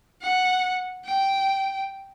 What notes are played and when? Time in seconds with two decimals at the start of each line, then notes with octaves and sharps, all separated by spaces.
0.22 F#5
1.05 G5